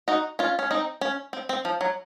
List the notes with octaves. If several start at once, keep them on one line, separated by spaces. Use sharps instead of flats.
D#4 F#4
C#4 F4
C#4
C4 D#4
C#4
C4
C4
F3
F#3